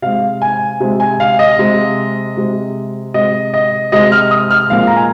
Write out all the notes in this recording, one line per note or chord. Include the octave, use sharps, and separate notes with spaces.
C3 G#3 F5
G#5
C3 G#3
G#5
F5
D#5
C3 G#3
C3 G#3
C3 G#3 D#5
D#5
C3 G#3 D#5
F6
D#6
F6
A#2 F3 G#3 F5
A#5
G#5